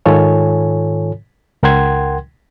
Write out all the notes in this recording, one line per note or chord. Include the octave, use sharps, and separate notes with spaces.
G#2 D#3 F4 A4 C#5 G#5
C#2 A#4 F#5 G5 C6 G#6